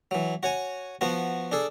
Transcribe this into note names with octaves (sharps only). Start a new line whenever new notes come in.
E3 F#3
F#4 C#5 G#5
F3 B3 F#4
D4 G#4 A4